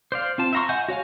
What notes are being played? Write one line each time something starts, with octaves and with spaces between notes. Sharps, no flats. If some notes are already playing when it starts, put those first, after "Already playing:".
C5 D5 F5
C4 F4 A5
E5 F5 A#5 C6 C#6
D#5 E5 F#5 G#5 G6
F#4 C#5 F5 G#5